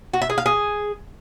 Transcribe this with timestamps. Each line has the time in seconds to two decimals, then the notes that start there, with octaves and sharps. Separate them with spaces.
0.13 F#4
0.22 E5
0.30 G#4
0.38 F5
0.46 G#4